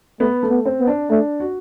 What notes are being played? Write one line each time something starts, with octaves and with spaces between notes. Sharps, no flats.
A3 B3
A3
B3
C4
B3
D4
A3 D4
F#4